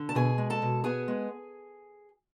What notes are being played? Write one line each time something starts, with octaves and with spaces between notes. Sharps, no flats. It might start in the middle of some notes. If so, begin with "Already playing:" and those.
Already playing: D3
A5
B2 G#4 G#5
G#3
A4 A5
B2
B3 G#4 G#5
G#3